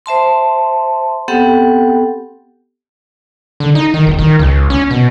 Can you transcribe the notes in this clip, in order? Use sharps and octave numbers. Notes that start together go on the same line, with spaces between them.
C5 E5 A5 C6
B3 C4 G4 A4 F#5 G5
D3
D#4
D#3
E1
D#3
C#2
C#4
B2